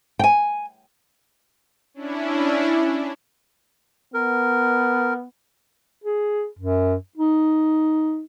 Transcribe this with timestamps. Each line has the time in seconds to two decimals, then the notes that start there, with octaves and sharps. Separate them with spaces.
0.19 G5 G#5
1.94 C#4 D4 E4
4.14 B3 A#4
6.04 G#4
6.59 F#2
7.17 D#4